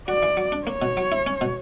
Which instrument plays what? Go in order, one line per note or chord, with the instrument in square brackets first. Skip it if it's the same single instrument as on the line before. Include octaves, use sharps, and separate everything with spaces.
[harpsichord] F#4 [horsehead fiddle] D5
[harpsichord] E3
F#3
D4
[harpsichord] A#3 [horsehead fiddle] C#5
[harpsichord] B2
F#3
E4
C#4
B2